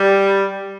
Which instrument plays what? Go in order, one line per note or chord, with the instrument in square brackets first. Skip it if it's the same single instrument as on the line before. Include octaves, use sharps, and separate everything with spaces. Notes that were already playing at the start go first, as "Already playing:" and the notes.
Already playing: [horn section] G3